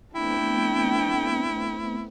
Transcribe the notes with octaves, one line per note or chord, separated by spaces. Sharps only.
A3 B3 C4 D4 E4 G5